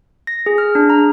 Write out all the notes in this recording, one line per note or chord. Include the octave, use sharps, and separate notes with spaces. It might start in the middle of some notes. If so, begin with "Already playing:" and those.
A#6
G#4
F6
D4
A#5